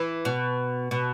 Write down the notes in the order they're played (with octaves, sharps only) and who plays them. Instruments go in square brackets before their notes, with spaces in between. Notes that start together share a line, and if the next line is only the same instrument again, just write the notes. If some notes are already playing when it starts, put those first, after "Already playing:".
Already playing: [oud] E3
B2
B2